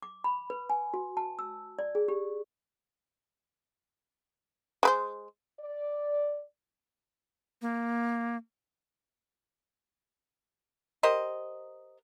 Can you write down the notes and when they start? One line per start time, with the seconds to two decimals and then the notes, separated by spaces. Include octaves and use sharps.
0.03 D6
0.24 B5
0.50 B4
0.70 G#5
0.94 F#4
1.17 A5
1.39 E6
1.79 D5
1.95 G#4
2.08 G4
4.83 G#3 B4 C5
5.59 D5
7.62 A#3
11.03 G4 A#4 C5 D#5